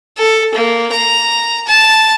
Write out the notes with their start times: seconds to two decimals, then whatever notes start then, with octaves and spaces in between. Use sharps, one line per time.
0.18 A4
0.55 A#3
0.92 A#5
1.67 A5